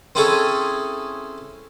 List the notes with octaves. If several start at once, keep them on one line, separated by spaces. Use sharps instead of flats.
C4 C#4 E4 G#4 A4 C#5